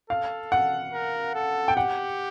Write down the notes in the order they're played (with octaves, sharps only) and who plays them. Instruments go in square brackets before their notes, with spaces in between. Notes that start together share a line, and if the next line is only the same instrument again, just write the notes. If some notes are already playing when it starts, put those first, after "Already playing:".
[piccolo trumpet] A4 [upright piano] F5
[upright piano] F#5
[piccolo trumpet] A#4
A4
[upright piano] G5
[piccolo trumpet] G4 [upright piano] F#5